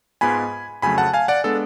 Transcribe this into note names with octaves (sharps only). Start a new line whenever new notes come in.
G#2 G#3 B3 F4 G#5 B5
F2 C#3 F#3 A3 G#5 B5
F#5 A5
F5 G#5
D5 F#5
G#3 B3 D4 A4